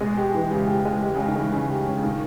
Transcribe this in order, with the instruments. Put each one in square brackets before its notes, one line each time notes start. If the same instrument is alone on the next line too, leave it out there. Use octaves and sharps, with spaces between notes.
[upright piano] B2 [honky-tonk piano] G#3
[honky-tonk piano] G4
E3
[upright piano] C#3 [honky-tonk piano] G4
[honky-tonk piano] G4
G#3
G4
[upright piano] C#3
[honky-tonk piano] G#3
[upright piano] D#3
[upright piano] E3 [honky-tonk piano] G#3
[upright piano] C#3 [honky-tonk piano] C#4
[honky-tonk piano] G4
C#4
[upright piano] C#3
[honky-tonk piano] A#2 [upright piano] D#3